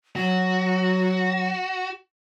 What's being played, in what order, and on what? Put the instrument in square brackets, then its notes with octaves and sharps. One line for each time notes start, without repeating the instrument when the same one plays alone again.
[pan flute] F#3 [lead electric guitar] F#4